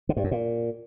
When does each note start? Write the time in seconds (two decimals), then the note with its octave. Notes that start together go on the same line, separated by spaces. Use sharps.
0.09 D3
0.17 G2
0.24 F#2
0.31 A#2